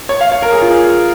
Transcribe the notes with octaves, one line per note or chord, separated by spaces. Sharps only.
C#5
F5
C#5
A#4
G#4
F4
G#4